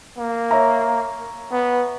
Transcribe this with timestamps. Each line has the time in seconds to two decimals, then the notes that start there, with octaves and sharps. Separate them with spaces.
0.18 A#3
0.51 C#5 E5 A#5
1.51 B3